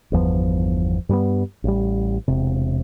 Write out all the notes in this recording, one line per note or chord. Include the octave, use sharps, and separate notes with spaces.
G1 E2 F3 B3
G2 G3 A#3 B3
A1 G3
E1 C3